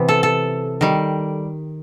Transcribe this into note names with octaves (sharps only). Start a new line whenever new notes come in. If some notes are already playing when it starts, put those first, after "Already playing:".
Already playing: C3 E3 B3
A4
A4
D#3 G3